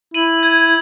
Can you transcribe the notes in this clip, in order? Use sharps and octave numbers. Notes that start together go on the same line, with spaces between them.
E4 D#7 F#7
G#6